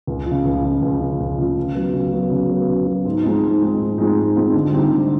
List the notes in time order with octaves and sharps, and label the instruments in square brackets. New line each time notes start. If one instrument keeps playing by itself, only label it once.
[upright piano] C#2
F3
C#3
C#2
C#3 F3
C#2
C#3 F3
C#2
C#3 F3
C#3
F#3 B3
C#3
F#3 B3
C#3
F#3 B3
C#3
F#3 B3
G#2
F3 G#3 C4 D#4
G#2
F3 G#3 C4 D#4
G#2
F3 G#3 C4 D#4
G#2
F3 G#3 C4 D#4
D3
G3 C4 D#4
D3